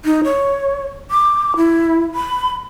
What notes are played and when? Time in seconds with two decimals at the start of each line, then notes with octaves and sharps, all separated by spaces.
0.05 D#4
0.24 C#5
1.11 D6
1.57 E4
2.15 B5